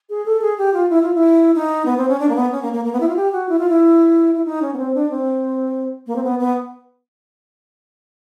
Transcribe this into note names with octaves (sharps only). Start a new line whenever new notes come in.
G#4
A4
G#4
G4
F4
E4
F4
E4
D#4
B3
C4
C#4
D4
A#3
B3
C#4
A#3
A#3
A#3
B3
E4
F4
G4
F#4
E4
F4
E4
E4
D#4
C#4
B3
C4
D4
C4
A#3
C4
B3
B3